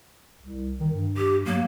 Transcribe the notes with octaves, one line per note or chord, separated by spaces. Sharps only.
C2
D#3
G2
G4
F#3 A#3